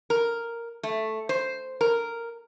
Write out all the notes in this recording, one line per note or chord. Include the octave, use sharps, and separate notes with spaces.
A#4
A3
C5
A#4